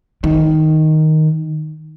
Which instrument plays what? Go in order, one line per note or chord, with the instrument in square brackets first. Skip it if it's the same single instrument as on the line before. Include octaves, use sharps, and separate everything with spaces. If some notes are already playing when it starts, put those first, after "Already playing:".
[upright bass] D#3